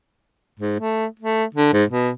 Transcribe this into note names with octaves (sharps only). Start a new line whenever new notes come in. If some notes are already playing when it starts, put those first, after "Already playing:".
G#2
A3
A3
D3
G#2
B2